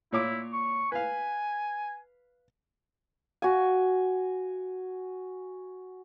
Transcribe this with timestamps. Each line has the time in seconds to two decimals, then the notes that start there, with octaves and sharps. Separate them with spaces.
0.13 A#2 E4 C#5 D6
0.53 C#6
0.92 B4 F5 G#5
3.42 F#4 G#5